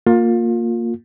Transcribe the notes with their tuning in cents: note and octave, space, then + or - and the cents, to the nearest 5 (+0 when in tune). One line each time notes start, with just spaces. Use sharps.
A#3 -10 F4 +25